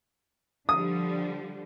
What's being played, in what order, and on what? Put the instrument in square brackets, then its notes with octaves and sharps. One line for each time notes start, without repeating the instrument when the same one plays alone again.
[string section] D3 F3 G3 [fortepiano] D#6